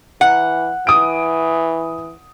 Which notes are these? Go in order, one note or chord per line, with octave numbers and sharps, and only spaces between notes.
E3 F#5
E3 D#6 D7